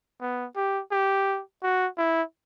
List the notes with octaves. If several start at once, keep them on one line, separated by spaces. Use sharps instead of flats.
B3
G4
G4
F#4
E4